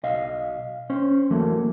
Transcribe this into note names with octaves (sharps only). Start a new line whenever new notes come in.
B1 D#5 F5
C#4 C5
E2 E3 F#3 A3 A#3